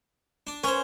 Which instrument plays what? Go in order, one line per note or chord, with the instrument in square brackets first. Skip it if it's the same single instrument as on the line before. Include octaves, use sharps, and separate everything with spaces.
[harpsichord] D4
[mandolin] B3 C#5 [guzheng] C#4 [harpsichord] A#4 C5